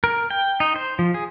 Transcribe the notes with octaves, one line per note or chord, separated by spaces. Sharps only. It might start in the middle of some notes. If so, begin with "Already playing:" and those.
A#4
G5
D#4
C5
F3
G#4